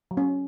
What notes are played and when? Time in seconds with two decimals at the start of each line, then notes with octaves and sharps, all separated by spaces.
0.11 F#3
0.17 C#4